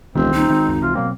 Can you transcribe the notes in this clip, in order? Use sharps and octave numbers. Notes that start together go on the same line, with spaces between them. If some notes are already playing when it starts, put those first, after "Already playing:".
E1 C#2 D#3 C4
D#1 D#4
G#1 D#3 G#3
C#2 F#2 D#3
C#2 C3 E3 F4
B2 F#3 A#3 C4